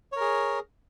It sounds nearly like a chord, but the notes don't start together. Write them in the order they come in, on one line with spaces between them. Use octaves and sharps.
C#5 A#4 G#4